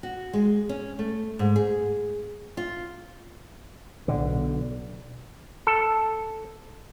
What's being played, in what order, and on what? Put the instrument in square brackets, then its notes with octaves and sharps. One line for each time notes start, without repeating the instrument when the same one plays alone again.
[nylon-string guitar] F#4
G#3
C#4
A3
G#2
G#4
F4
[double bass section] B1 [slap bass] D3
[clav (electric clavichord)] A4